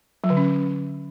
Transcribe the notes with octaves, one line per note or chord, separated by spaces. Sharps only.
F#3
D3
C#4